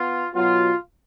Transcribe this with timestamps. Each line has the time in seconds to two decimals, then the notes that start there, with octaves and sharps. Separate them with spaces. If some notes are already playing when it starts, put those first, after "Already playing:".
Already playing: B3 F4
0.34 B2 F#3 B3 F4